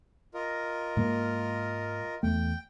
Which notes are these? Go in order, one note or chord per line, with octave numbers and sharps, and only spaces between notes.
F4 A#4 D#5
G#2 G#3 A#3
E2 A3 G5